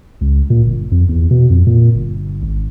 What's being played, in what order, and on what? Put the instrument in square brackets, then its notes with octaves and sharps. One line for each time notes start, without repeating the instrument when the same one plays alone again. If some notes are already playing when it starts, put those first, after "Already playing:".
[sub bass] C#2
A#2
G1
F2
E2
B2
F2
A#2
G1
G#1